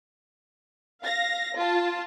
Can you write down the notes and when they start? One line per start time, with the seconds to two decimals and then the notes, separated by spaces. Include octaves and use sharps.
1.03 F5 A#6
1.55 F4 A5